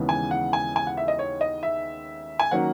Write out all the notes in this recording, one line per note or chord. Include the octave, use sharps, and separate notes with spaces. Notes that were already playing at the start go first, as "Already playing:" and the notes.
Already playing: D#2 C#3 E3 G#3 B3
G#5
F#5
G#5
G#5
F#5
E5
D#5
C#5
D#5
E5
G#5
D#3 F#3 A#3 C#4 F#5